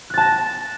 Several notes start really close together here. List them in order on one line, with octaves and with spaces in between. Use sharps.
F#6 A6 A5 A#6